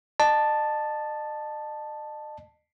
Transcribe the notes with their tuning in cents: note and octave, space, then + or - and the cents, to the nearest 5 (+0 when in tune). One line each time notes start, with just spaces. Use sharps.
D#5 -40 A5 +0